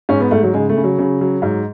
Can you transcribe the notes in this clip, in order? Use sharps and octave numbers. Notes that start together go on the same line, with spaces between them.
G#2 C#4
B3
G#2 A3
F#3
C#3 G#3
A3
C#3
F#3
C#3
F#3
G#2